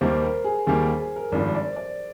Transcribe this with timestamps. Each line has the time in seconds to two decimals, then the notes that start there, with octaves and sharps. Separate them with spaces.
0.01 D#2 D#3 G3 A#3 C5
0.22 A#4
0.44 G#4
0.67 D#2 D#3 G3 A#3 G#4
0.83 A#4
1.00 G#4
1.16 A#4
1.32 G#1 G2 F3 D5
1.55 D5
1.67 C5
1.76 D5